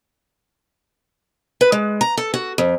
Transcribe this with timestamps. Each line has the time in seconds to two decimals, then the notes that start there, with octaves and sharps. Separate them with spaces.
1.61 B4
1.72 G#3
2.01 A#5
2.18 A4
2.34 F#4
2.58 F2